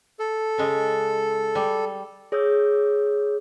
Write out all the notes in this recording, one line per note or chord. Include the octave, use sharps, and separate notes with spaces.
A4
C#3 G#3
G3
G#4 C#5 D#6 E6 G6